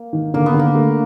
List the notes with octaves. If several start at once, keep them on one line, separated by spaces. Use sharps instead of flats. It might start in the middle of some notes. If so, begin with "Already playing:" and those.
Already playing: A#3
D#3
D3 A#3
B3
D3
A#3
A3